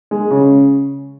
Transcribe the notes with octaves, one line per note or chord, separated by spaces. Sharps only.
G#3
C#3